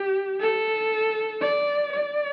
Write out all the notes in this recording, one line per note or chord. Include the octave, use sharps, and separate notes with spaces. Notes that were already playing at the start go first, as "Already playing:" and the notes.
Already playing: G4
A4
D5
D5